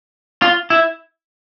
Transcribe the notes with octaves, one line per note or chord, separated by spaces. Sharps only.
F4
E4